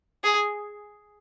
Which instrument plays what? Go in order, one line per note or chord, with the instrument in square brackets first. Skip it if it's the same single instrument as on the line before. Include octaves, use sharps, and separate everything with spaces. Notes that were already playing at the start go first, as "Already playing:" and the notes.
[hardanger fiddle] G#4